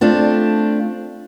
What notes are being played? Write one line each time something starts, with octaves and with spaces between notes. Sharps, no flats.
A3 C4 D4 F4